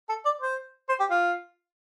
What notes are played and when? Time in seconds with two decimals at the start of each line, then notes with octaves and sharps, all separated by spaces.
0.09 A4
0.25 D5
0.41 C5
0.89 C5
1.00 G4
1.10 F4